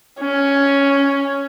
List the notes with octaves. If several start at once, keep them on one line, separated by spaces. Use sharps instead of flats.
C#4